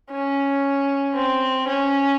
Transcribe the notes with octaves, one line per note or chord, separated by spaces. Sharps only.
C#4
C4
C#4